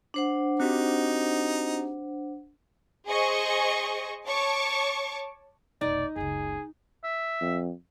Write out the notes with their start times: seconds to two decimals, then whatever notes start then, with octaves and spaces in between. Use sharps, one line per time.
0.14 D4 C5 F#5
0.60 C4 D#4 F#4 G4
3.08 G#4 C5 D#5 C#6
4.27 C#5 A5 C#6 D6
5.81 F1 B1 D#4 D5
6.16 F#1 C#2 G#4
7.04 E5
7.41 F2